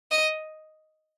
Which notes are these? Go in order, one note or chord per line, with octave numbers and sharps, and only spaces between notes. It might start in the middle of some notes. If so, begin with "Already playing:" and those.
D#5